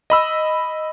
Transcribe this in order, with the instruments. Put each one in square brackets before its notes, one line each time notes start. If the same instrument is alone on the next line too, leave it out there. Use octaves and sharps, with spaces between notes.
[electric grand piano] D#5 B5 E6